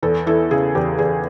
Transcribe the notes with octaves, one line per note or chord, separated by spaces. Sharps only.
E2 A4
E3 A4
C#3 G#4
E2 G4
E2 G#4